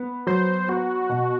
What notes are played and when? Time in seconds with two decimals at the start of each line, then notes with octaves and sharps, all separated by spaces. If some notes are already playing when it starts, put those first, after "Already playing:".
Already playing: B3
0.27 F#3 C5
0.68 B3 F#4
1.09 B2